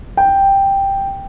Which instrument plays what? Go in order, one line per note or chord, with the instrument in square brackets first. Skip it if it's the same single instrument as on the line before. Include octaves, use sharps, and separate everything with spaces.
[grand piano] G5